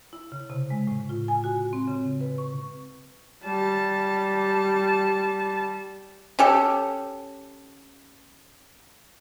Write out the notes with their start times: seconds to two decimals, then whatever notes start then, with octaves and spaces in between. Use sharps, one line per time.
0.13 E4
0.32 C#3
0.50 C3
0.70 G#3
0.87 A2
1.09 F4
1.28 G#5
1.44 F#4
1.73 C4
1.87 C#3
2.21 B4
2.38 C#6
3.44 G3 A5
6.39 C#4 G4 A4